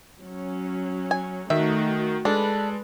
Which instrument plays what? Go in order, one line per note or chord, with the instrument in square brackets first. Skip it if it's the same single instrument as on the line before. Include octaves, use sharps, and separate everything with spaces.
[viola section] F#3 C#4
[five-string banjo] G#5
[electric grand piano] D#3 [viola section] A3 D#4 F#4 [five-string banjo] E5
[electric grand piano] G#3 A4 [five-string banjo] D4 [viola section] B4